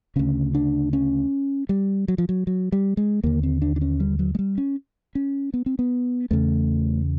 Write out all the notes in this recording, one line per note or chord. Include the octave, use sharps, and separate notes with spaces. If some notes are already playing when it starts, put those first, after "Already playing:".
D2 C#3 C#4
D4
C#4
G3
F#3
F3
F#3
F#3
G3
G#3
D#2 D3 A#3
C4
D4
D4
C#4
G3
F#3
G#3
G3
C#4
C#4
B3
C4
B3
E2 C#3 A3